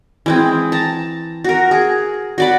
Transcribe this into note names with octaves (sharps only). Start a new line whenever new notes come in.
E3 G#3 C4
A5 A#5
F#4 A#4
G#4
F#4 D5 B5